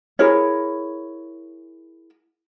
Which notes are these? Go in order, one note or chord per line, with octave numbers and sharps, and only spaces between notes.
E4 G#4 A#4 C#5